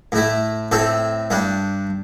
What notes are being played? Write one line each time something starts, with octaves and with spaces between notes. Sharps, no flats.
A2 A3 E4
A2 A3 C4 A4
G2 G3 D4